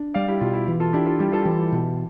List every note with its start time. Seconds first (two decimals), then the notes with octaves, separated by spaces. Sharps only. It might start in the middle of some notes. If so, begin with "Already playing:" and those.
Already playing: D4
0.14 G3 D5 F5
0.28 E4 G4
0.41 B2 F4
0.53 E4
0.68 E3 F4
0.80 F4 A4
0.93 D4 E4 G4
1.06 F4 A4
1.19 G3 E4 G4
1.32 F4 A4
1.42 G4
1.45 E3 F4
1.59 E4
1.72 B2